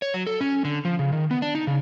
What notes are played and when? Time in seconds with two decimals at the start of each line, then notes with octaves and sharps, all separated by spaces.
0.02 C#5
0.14 F#3
0.27 A4
0.41 C#4
0.65 D3
0.85 F3
0.99 C#3
1.13 D#3
1.31 B3
1.42 D4
1.55 D#4
1.67 C#3